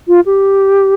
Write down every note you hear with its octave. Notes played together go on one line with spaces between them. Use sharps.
F4
G4